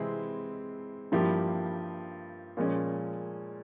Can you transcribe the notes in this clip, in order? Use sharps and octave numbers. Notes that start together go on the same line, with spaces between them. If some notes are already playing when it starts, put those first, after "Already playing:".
Already playing: C3 E3 G#3 C4 E4
G2 F3 A#3 E4 G4
A#2 F3 G#3 C#4